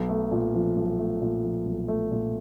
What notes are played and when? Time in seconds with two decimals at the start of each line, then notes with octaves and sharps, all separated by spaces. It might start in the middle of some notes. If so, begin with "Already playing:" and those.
Already playing: B1
0.09 A3
0.32 A#2
0.54 F3
0.77 B1
0.99 A3
1.22 A#2
1.43 F3
1.66 B1
1.88 A3
2.11 A#2